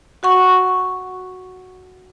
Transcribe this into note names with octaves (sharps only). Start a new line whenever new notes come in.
F#4 F#5 C#6